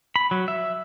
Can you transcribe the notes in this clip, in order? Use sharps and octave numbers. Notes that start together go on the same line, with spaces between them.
B5
F#3
E5